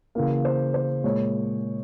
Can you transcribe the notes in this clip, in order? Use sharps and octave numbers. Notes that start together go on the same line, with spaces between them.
C#3 E3 A#3 F5
C5
C5
A#2 G#3 C#5